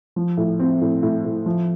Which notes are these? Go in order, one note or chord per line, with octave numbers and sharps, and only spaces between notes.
F3
A2
C4
A2
A2
A2
F3